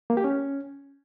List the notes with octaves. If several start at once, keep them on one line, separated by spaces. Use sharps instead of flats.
A#3
G4
C#4